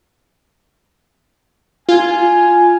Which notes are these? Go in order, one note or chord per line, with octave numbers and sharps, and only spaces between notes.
F4 G#5